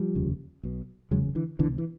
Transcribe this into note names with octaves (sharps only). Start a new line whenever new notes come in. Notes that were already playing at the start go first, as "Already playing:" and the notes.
Already playing: F3 G3
F1 D#2 C#3
B1 B2
F1 E2 C#3 F#3 G#3
D3 E3
C2 B2 D3 E3
E3